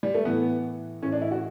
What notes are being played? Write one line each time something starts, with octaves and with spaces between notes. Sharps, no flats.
G3
A3
A2 E3 B3
A2 E3 C#4
D4
E4
F#4